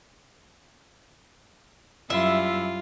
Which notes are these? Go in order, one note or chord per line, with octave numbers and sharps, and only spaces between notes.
F#2 G3 E4 F4 E5